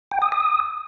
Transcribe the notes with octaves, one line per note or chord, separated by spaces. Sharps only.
G5
D#6
D#6